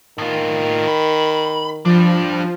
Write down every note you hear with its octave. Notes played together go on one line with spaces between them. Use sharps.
A2 D#3 F4
B5
F3 G3 D4